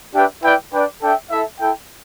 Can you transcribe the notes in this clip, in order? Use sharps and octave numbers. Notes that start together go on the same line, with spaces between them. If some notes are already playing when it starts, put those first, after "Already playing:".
D4 G4 B4 E5 G5
E4 B4 D5 G5
D4 B4 D5 G5
D4 A4 E5 G5
E4 A4 E5
E4 A4 G5